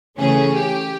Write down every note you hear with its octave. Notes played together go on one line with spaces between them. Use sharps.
C#3 E3 A3 C#4 G#4
G4